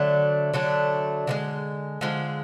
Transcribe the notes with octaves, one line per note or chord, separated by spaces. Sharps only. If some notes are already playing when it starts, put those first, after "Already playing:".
Already playing: D3 F#3 A3 D4
D3 F#3 A3 D4
D3 F3 G#3
D3 F3 G#3